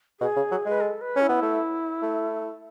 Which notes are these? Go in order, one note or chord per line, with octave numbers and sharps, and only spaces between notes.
B2 G#4
C#3
F#3
G#3 B4
A4
B4
C#4
E4
B3
A3
A3